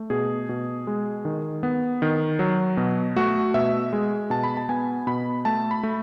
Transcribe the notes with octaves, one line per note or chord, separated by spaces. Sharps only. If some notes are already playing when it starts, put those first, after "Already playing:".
Already playing: A3
B2 G#4
B2
G#3
D#3
B3
D#3
F#3
B2
A3 F#4
B2 E5
G#3
B2 A5
B5
A5
B3 G#5
B2 B5
A3 A5
B5
A3